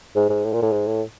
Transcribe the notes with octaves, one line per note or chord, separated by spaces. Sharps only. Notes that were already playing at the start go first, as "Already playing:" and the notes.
G#2
G#2
A2
A#2
A2
G#2
A2